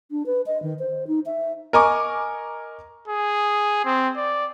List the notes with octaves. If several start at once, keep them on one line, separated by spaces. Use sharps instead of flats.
D4
B4
D#5
D#3
C5
D#4
E5
A#4 D#5 G#5 A#5 C#6 D6
G#4
C4
D5